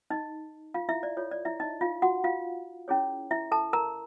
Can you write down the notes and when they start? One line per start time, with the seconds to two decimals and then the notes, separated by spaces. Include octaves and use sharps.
0.10 D#4 D#5
0.74 F4 F5
0.89 E4 E5
1.03 D5
1.17 F4 A4 C#5
1.31 D5
1.45 E4 E5
1.60 D#4 D#5
1.81 F4 F5
2.02 F#4 F#5
2.24 F4 F5
2.88 C#4 E4 G#4 C#5
3.31 E4 E5
3.52 A4 A5
3.73 A#4 A#5